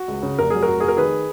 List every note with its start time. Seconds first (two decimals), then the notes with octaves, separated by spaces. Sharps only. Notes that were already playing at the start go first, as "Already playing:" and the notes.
Already playing: F#4
0.08 C#2
0.23 C#3
0.39 F1 A#4
0.50 F#3 G#4
0.62 F#4 A#4
0.68 F1
0.80 F1 G#4
0.88 A#4
0.97 D#3 G#4 B4